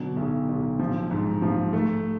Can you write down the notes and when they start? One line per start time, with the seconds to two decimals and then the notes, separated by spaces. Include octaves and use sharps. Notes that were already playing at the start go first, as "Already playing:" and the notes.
Already playing: B2 D3 F#3
0.16 B1
0.49 B1
0.79 F3
1.11 G#2
1.42 F3
1.73 A3